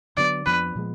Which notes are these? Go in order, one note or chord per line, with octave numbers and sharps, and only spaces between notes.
D3 F#3 B3 D5
F2 F3 B3 D4 B4
A#2 F3 G#3 B3